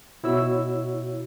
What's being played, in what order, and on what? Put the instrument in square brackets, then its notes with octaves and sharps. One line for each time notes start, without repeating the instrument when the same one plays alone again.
[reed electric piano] B2 E4 F#4 C#5 E6